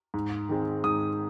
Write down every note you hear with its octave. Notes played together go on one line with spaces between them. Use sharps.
G#2
D#3 G#3 C4
G#2 D#6